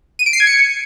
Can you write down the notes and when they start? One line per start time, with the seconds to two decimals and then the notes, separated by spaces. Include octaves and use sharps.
0.19 D#7
0.26 D7
0.33 C7
0.40 G#6
0.47 C#7